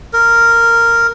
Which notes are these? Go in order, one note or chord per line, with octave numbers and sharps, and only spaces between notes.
A#4